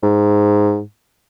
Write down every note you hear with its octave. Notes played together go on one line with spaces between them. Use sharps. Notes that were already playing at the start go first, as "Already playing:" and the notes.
G#2